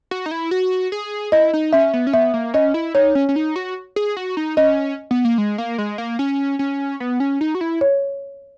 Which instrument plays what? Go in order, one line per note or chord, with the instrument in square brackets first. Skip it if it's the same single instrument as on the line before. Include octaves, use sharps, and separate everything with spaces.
[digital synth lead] F#4
D#4
E4
F#4
G#4
[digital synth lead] E4 [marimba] D#5
[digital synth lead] D#4
[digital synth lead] C#4 [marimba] E5
[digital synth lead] B3
C#4
[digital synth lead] B3 [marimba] E5
[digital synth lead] A#3
[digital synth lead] C#4 [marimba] D#5
[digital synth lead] E4
[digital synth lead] D#4 [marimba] C#5
[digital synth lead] C#4
C#4
D#4
F#4
G#4
F#4
D#4
[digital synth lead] C#4 [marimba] D#5
[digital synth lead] B3
A#3
G#3
A#3
G#3
A#3
C#4
C#4
B3
C#4
D#4
F#4
E4
[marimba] C#5